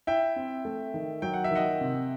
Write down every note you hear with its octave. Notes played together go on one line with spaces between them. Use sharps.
E4 E5 G5
C4
A3
D#3
F#3 G5
F#5
E5
D#3 D#5 F#5
C3